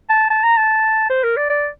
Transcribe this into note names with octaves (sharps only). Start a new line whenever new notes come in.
A5
A5
A#5
A5
C5
A#4
D5
D5